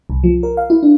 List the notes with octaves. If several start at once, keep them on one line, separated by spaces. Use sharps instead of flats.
C2
F3
A#4
F5
E4
D4